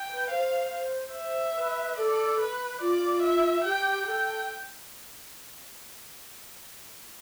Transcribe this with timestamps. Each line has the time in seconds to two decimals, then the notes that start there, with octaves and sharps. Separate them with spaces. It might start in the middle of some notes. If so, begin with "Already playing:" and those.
Already playing: G5
0.09 B4
0.30 C5 F5
1.14 E5
1.55 B4
1.97 A4 D5
2.39 B4
2.81 F4 D5
3.22 E5
3.64 G4 G5
4.06 A4 G5